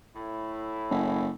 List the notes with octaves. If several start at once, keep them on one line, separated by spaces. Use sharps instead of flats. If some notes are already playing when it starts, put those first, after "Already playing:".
A2 E4
F#1